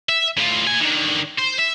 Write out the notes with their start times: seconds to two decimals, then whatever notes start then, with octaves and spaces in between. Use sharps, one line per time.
0.09 E5
0.37 A2 F4
0.67 A#2 G#5
0.80 D3 D#3
1.38 C5
1.58 E5